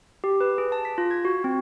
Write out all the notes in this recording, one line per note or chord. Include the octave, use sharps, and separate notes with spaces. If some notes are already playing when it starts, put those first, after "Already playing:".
G4
B4
G#4
A5
B6
F4
G#6
F#4
C4